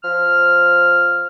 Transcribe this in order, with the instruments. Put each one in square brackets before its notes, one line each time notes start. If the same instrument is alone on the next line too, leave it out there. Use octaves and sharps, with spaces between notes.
[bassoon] F3 [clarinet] F6